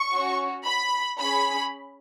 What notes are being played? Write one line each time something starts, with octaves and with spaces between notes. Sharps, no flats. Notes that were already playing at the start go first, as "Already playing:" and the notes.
Already playing: C#6
C#4 F#4
B5
C#4 G#4 B5